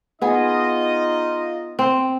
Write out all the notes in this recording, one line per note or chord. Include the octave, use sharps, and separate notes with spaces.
B3 D#4 F4 G#4 D#5
C4